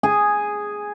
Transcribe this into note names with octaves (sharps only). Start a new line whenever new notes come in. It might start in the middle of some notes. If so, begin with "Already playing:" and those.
G#4